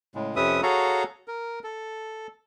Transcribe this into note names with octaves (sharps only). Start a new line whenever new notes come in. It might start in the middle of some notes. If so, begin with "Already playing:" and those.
A2 C#3 G#3
F2 C3 C#4 B4 E5 D#6
F#4 G#4 A4 C#5 F5 A#5
A#4
A4